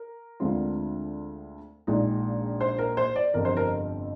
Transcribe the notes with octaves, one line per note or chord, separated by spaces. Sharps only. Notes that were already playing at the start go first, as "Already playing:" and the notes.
Already playing: A#4
D2 D3 G#3 C4 F4
A#1 A#2 G#3 D#4
C5
A#4
C5
D5
G1 F2 C3 A#4
C5
A#4